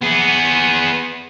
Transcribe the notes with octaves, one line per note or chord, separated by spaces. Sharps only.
B3 G#4